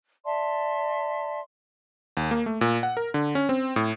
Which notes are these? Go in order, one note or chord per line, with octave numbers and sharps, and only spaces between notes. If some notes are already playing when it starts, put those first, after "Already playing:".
D5 E5 A5 C6
D#2
A#3
A3
A#2
F#5
A#4
D3
C#4
C4
A2